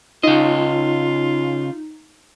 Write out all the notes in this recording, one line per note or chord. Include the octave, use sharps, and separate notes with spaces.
C#3 D#4 F4 D#5